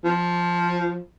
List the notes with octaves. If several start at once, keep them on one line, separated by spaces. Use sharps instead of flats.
F3